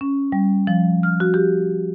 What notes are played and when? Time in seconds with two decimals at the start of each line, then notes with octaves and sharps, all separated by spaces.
0.01 C#4
0.32 G3
0.67 F3
1.03 F6
1.20 F#4
1.34 G4